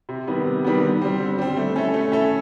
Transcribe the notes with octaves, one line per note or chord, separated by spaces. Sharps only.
C3
D#3 G3 B3
C3
D#3 G3 B3
D3
G3 C4
D3
G3 C4
A3
C#4 E4 A4
A3
C#4 E4 A4